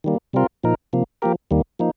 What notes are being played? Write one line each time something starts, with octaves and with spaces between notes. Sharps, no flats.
D#3 G3 A#3
C3 G3 C4 F4 A#4
A#2 F3 D#4 A#4
C3 F3 A#3
F3 A#3 G4 A#4
D#2 D#3 G3 A#3
F3 A#3 D#4